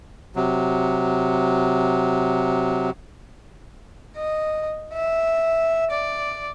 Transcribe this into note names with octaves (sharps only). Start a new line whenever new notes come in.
C3 F#3
D#5
E5
D5